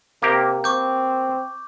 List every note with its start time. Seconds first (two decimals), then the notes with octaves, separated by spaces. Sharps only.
0.22 C3 A#3 G4 A#4
0.64 C4 C#6 D6 G6